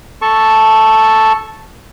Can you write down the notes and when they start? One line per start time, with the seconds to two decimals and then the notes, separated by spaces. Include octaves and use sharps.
0.22 A4 A5 C#6